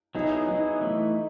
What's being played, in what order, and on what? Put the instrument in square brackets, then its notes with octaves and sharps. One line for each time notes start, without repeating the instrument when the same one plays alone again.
[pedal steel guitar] F#3 B3 E4 G#4 [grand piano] D#4
[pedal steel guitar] F#3 B3 E4 G#4 [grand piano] D#4
[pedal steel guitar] E3 A3 E4